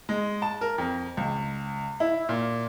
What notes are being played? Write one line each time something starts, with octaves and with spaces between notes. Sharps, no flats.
G#3
A5
A#4
F2
C#2
E4
A#2